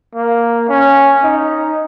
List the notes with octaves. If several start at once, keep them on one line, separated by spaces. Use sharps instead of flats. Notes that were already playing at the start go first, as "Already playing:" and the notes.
A#3
C#4
D#4